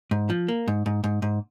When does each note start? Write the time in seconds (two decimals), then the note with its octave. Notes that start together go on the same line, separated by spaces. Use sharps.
0.11 G#2
0.30 F3
0.48 A#3
0.68 G#2
0.86 G#2
1.04 G#2
1.22 G#2